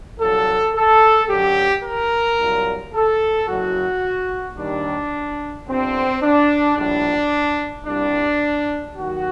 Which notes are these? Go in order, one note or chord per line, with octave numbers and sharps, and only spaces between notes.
C2 A#2 F#3 A4
A4
F#2 D3 F#3 G4
A#4
C2 A#2 F#3
A4
F#1 F#2 F#3 F#4
D#2 D#3 G3 D4
G1 G2 D3 C4
D4
A#1 A2 G3 D4
C2 A#2 G3 D4
D#2 D#3 F#3 F#4